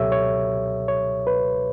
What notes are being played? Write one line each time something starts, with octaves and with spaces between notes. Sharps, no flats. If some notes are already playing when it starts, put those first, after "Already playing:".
Already playing: C#2 B2 F#3 G4 A4 C#5 E5
C#5
C#5
B4